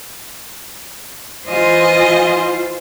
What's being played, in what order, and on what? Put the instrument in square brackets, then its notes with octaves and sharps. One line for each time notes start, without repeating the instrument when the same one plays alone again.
[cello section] E3 F4 C5 [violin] D#5 G#5